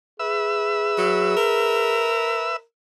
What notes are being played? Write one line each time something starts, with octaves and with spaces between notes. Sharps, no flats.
G#4 B4 E5 E6
F#3
A#4